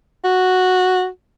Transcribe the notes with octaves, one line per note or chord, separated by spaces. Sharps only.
F#4